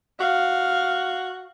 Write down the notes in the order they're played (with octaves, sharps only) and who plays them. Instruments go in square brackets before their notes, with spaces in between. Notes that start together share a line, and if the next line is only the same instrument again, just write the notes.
[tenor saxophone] F#4 [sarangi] F5